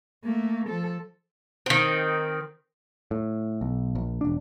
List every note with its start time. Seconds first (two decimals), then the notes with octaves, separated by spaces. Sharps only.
0.24 A3 A#3
0.69 F3 A4
1.66 D#3 C4
3.11 A2
3.61 B1
3.95 A#1
4.21 E1 D4